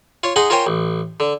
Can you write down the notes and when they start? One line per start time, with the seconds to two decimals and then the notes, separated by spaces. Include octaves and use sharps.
0.23 F4 C#5
0.36 D#4 G#4 D#5 F#5 G#5 C6
0.50 F4 A#4 C5 C#5 G5 G#5
0.67 A1
1.20 D3